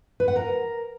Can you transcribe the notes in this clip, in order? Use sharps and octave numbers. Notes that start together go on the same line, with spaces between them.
B4
F#5
A#4